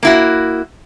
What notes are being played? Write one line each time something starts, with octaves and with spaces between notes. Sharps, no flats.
A#3 E4 F#4